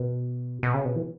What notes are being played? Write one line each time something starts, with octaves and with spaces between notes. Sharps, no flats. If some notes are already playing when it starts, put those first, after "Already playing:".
Already playing: B2
B2
C#3
B2
E3